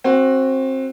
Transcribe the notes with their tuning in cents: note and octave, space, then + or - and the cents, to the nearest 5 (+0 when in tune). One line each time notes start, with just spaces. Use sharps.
C4 +20 F#4 +0